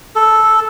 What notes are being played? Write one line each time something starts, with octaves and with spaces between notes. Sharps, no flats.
A4